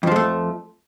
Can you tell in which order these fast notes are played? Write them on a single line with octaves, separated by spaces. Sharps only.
F2 F3 G#3 A3